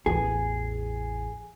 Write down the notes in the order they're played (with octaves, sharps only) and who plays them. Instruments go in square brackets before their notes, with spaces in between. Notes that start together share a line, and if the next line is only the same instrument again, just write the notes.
[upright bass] A1 E2 [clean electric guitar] G#4